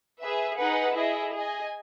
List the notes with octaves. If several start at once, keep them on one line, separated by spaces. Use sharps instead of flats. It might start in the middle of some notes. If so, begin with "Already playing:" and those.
G#4 B4 E5
D#4 G#4 B4 F#5
E4 G#4 D#5
G#4 D#5 G#5